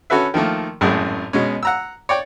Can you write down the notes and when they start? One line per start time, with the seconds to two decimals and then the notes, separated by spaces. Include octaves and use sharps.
0.10 C#4 F#4 A4 B4 E5
0.34 D#3 F3 A3 A#3
0.81 G#1 F#2 A2 G#4
1.33 B2 G#3 C#4
1.63 F#5 A#5 E6
2.09 C#5 D5 G5